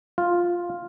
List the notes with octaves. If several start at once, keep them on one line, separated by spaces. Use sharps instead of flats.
F4